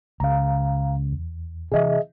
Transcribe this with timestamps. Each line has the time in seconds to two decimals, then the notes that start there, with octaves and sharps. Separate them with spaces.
0.20 C#2 C#3 F5 A#5
1.12 E2
1.72 C3 E3 G#4 D#5 E5